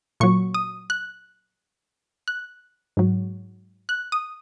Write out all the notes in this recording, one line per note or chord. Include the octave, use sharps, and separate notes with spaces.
A#2 F#3 C#6
D#6
F#6
F#6
G#2 F#3
F#6
D#6